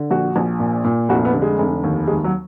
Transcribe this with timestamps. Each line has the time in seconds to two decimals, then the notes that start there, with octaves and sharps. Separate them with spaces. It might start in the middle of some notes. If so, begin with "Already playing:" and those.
Already playing: D3
0.11 A#1 F#4
0.36 A#1
0.59 A#2
0.84 A#2
1.09 F1 F#4
1.25 B3
1.34 D3
1.42 G#3
1.58 F1
1.83 D#2
2.07 D#2 G#3
2.24 F#3